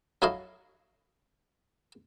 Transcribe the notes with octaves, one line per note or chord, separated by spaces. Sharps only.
F#3 E4 F#4 A4 D#5 F5